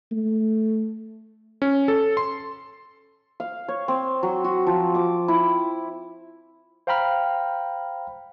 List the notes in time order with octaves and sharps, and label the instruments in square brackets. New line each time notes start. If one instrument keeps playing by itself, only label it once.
[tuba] A3
[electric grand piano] C#4
A4
C6
[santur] F5
C#5
C4
F#3
F#4
F3
D6
E4
[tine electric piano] C5 F5 G5 A#5 B5 F6